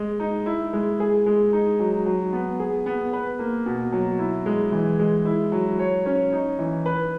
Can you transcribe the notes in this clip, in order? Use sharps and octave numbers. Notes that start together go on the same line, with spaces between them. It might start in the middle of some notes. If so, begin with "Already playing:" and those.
Already playing: G#3
D#4
E4
G#3
G#4
G#3
D#4
F#3
F#3
B3
G#4
B3
B4
A#3
B2
F#3
E4
G#3
E3
G#3
E4
F#3
C#5
C#4
D#4
E3
B4